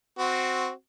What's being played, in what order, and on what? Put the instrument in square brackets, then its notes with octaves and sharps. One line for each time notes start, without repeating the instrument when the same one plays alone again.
[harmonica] C4 F#4